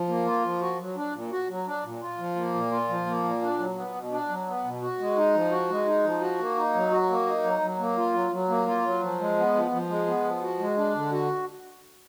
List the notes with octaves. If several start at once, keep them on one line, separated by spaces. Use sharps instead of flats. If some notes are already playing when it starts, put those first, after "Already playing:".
Already playing: F3
A#3
F4
F3
F#4
F#3
D4
A#2
F#4
F#3
D4
A#2
F4
F3
A#3
A#2
F4
F3
A#3
A#2
D4
F#3
B3
B2
D4
F#3
B3
B2
F#4
G#3
D#4
F3
F#4
G#3
D#4
F3
F#4
A#3
D#4
F#3
F#4
A#3
D#4
F#3
F#3
A#3
F4
F#3
F#3
A#3
F4
F#3
F3
G#3
B3
F3
F3
G#3
B3
F3
F#4
G#3
D4
D3
F#4